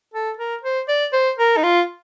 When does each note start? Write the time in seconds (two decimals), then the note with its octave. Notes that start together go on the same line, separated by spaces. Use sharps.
0.14 A4
0.38 A#4
0.63 C5
0.88 D5
1.13 C5
1.38 A#4
1.57 D#4
1.63 F4